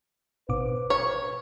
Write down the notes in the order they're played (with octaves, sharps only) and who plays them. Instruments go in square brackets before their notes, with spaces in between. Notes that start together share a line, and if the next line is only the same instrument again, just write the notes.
[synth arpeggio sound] G#1 B2 D6 [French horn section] B4 C5
[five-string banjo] C#5